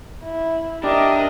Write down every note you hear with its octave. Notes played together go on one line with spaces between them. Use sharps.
E4
D4 G4 A#4 D#5 E5